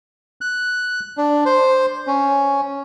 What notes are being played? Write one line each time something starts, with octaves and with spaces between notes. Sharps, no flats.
F#6
D4
C5
C#4